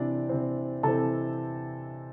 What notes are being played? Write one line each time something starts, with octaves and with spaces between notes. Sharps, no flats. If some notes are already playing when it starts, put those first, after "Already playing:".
Already playing: C3 E3 C4 D4 D5
C3 E3 C4
C3 E3 C4 A4 A5